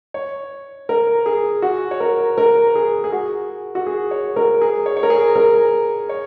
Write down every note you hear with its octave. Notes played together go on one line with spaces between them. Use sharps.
C#5
A#4
G#4
F#4
C#5
A#4
A#4
G#4
G#4
F#4
F#4
G#4
C#5
A#4
G#4
C#5
C#5
A#4
G#4
A#4
C#5